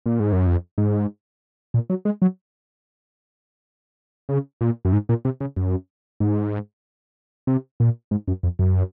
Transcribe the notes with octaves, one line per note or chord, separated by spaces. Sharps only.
A#2
G#2
F#2
F2
G#2
A#2
F#3
G#3
F#3
C#3
A#2
F#2
G#2
A#2
C3
C#3
F#2
G#2
C3
A#2
G#2
F#2
F2
F#2